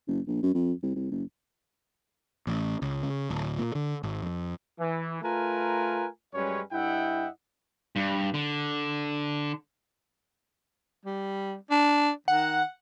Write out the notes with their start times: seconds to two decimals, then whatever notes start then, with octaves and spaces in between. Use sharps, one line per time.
0.07 F#1
0.27 A#1
0.43 F#2
0.54 F2
0.83 C2
0.96 C2
1.11 F#1
2.47 A1
2.82 C#2
3.03 C#3
3.30 D1
3.59 A#2
3.75 D3
4.03 G#1
4.22 F2
4.79 E3
5.22 A3 F4 A#4 B4 G#5 A#5
6.34 F#2 G3 G#3 C#4 B4 C#5
6.72 G2 E4 D#5 E5 F#5 G5
7.96 G2
8.34 D3
11.05 G3
11.71 D4
12.28 D#3 F#5